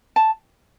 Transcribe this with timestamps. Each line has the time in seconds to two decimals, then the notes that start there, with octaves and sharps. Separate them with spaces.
0.16 A5